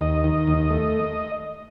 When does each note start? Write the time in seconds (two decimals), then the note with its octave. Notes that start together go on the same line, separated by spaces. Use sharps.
0.01 D#2 D#5
0.24 D#3
0.47 D#2
0.70 A3